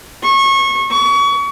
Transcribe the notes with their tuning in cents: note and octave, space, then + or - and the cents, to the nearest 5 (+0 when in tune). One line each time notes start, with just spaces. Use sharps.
C#6 -25
C#6 +30